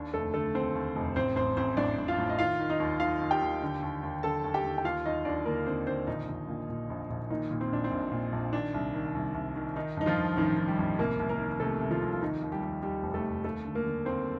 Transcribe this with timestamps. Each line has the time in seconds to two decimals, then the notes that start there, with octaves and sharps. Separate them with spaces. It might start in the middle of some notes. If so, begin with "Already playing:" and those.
Already playing: D#2 D4
0.14 F1 A3 A4
0.34 D3 A3 A4
0.54 D#2 C4 C5
0.75 D#2
0.96 F1
1.16 A1 C4 C5
1.36 A1 C4 C5
1.57 A1 C4 C5
1.77 A1 D4 D5
1.98 A1
2.08 F4 F5
2.18 A2
2.29 D#5
2.39 D#3 F4 F5
2.60 D#3
2.70 D#4 D#5
2.80 D#2
3.00 D#3 F4 F5
3.21 D#2
3.31 G4 G5
3.41 D#2
3.62 D3
3.83 D#2
4.03 D#2
4.23 D3 A4 A5
4.44 D#2
4.54 G4 G5
4.64 D#2
4.78 G5
4.84 D#2 F4 F5
5.05 D#2 D#4 D#5
5.25 D#2 D4 D5
5.45 D3 A#3 A#4
5.66 D3 C4 C5
5.86 D3 C4 C5
6.07 A#1 D#3 D#4
6.29 A#1
6.48 A#2
6.69 A#2
6.90 A#1
7.10 A#1
7.30 A#2 D#3 D#4
7.51 A#2
7.61 C4
7.72 A#1 D4
7.84 C4
7.91 A#1
8.12 A#2
8.32 A#1
8.53 D#3 D4
8.74 C2
8.94 D#3
9.15 C2
9.34 C2
9.56 D#3
9.76 D#3 D#4
9.97 G2 D#4
10.06 F3 F4
10.17 G2
10.37 A1 D#3 D#4
10.58 D#3
10.68 G3 G4
10.79 A1
10.99 C2 A#3 A#4
11.19 C2
11.29 A#3 A#4
11.39 D#3
11.60 C3 A3 A4
11.81 C2
11.91 F3 F4
12.02 C2
12.13 F4
12.21 D#2 D#3 D#4
12.42 D#2
12.52 G3 G4
12.62 D#2
12.83 D#2 G3 G4
13.03 F1
13.14 A3 A4
13.24 F1
13.44 D#2 A3 A4
13.64 D3
13.75 A#3 A#4
13.86 D3
14.05 D#2 C4 C5